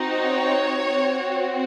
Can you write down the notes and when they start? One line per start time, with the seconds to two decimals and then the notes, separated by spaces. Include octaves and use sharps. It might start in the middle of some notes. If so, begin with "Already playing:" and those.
Already playing: C4 D#4 F#4
0.22 C#5
0.88 C4 F#4